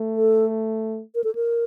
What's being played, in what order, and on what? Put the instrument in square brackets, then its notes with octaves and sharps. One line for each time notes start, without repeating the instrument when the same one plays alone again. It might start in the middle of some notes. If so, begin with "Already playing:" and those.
Already playing: [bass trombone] A3
[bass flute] A4
A#4
A4
A#4